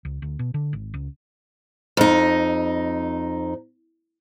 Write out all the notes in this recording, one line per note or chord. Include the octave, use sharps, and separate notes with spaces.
C#2
D2
B2
D3
G#1
C#2
F2 D#4